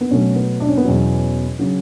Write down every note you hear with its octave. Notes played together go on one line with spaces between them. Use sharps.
B3
B2 F#3 A3 C#4
B3
D4
C#4
B3
E2 B2 F#3 C#4
C#3 F#3